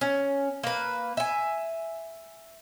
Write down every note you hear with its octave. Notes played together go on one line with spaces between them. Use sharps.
C#4
A#3 B4
E5 G#5